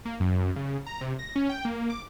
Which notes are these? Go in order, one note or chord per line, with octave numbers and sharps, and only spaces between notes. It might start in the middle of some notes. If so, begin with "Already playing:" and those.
A#3
F#2
C#3
A#5
C3
A#6
C#4
G5
A#3
D6